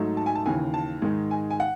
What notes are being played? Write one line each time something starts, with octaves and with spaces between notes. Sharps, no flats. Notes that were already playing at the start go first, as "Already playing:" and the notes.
Already playing: G#2 F#3 A3 D#4
A5
G#5
A5
D#2 C#3 E3 G#5
A5
G#2 D#3 G#3 D#4
G#5
G#5
F#5